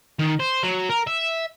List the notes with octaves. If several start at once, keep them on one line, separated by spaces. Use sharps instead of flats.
D#3
C5
F#3
A#4
E5